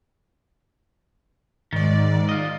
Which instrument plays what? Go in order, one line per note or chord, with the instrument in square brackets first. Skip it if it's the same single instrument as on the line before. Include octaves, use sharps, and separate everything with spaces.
[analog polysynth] G#2 D5 [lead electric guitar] D#3
[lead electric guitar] F4 D#5